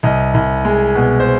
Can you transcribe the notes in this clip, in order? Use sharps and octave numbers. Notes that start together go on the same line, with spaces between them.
C2 D#5
C2
G#3
B2
C5